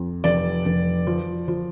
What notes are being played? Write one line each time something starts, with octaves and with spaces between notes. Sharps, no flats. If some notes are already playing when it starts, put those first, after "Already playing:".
Already playing: F2
F1 D5
F1
F3
F3